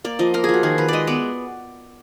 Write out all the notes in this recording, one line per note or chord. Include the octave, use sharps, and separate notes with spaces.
A#3 D5
F3 D#5
A#3 A#4
F3 G#4
F#4
D#3 G#4
D#3 B4
G#3 D5 D#5
B3 D5